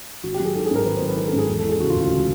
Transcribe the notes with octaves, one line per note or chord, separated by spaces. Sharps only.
G#1 F#4
G4
F#3
G#4
D#3 A4
G#4
G#2 A#4
G#1 B4
C5
F#3
B4
D#3 A#4
A4
G#2
G#4
E1 A4
A4
E3
G#4
C#3 F#4
F4
D2
F4
F#4